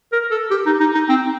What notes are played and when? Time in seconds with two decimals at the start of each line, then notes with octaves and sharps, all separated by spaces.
0.12 A#4
0.31 A4
0.51 G4
0.66 D#4
0.80 D#4
0.94 D#4
1.09 C4